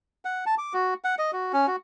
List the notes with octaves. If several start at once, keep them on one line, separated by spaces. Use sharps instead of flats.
F#5
A5
D6
F#4
F#5
D#5
F#4
C#4
F#4